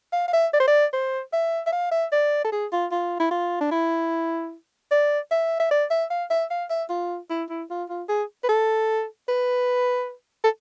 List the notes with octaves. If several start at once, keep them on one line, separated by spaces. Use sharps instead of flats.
F5
F5
E5
D5
C5
D5
C5
E5
E5
F5
E5
D5
A4
G#4
F4
F4
E4
F4
D4
E4
D5
E5
E5
D5
E5
F5
E5
F5
E5
F4
E4
E4
F4
F4
G#4
B4
A4
B4
A4